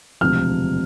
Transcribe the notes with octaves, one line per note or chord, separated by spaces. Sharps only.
E1 D2 C3 F3 F6